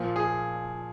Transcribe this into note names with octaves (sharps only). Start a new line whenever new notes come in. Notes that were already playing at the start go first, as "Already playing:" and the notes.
Already playing: A#2 F3
G#4